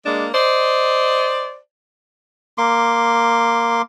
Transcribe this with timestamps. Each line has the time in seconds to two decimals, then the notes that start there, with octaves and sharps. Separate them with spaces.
0.06 G#3 A#3 D4
0.33 C5 D5 D#5
2.58 A#3 C6 D6